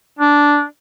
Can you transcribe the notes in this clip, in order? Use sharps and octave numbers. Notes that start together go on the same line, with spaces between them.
D4